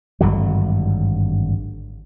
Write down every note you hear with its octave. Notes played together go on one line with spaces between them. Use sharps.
G#1 G2 D3 F#3